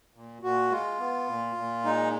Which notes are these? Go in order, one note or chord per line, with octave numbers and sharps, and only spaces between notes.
A#2
A#2 F#4
G#3 F4
B3
A#2
A#2
G#3 D#4